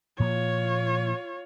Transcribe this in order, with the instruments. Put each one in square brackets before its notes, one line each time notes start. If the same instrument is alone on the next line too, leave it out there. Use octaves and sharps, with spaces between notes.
[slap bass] A#2 F3 A#3 [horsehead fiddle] F4 C#5